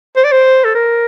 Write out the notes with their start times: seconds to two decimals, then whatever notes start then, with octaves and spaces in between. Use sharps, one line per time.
0.16 C5
0.24 D5
0.32 C5
0.64 A4
0.74 A#4